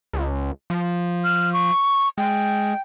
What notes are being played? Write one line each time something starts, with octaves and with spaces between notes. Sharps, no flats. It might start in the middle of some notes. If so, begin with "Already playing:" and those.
C#2
F3
F6
C#6
G#3 G5